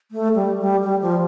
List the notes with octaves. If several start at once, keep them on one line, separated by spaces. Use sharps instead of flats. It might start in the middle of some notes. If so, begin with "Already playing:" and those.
A3
G3
G3
G3
F3